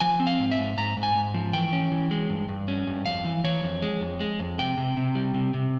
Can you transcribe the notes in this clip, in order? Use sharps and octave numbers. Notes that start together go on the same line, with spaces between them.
F3 G#5
C4
F5
G#2
E5
G#2
G#2 A#5
G#2
G#5
G#2
F3
E3 G5
C#4
E3
G#3
G2
G2
C#4
G2
F2 F5
E3
E3 C#5
F2
G#3
F2
G#3
F2
C3 G5
C3
C3
G3
C3
C3